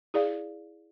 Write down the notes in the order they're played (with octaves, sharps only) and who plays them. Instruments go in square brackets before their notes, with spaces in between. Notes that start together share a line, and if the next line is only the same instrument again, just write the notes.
[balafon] E4 G#4 D5 F5